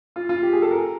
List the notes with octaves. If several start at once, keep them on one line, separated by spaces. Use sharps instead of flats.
F4
F4
G4
G#4
A4
A#4